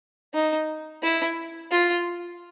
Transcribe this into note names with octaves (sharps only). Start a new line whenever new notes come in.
D#4
E4
F4